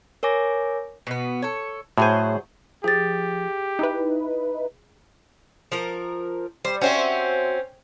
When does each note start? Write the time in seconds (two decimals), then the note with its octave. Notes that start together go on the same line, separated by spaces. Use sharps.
0.23 A#4 C#5 G#5 D6 A#6
1.07 B2 B3
1.42 A4 C#5
1.98 A2 F#3 G#4 C5 G#5
2.84 F3 G4 G#4 A6
3.79 D#4 E4 B4
5.72 F3 A#4
6.65 G3 C5
6.81 C4 C#4 F#4 C5 E5